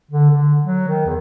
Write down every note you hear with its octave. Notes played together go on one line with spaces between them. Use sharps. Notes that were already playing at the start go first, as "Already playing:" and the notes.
D3
D3
F#3
D#3
E2